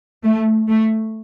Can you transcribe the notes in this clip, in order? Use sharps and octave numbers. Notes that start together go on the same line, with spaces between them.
A3
A3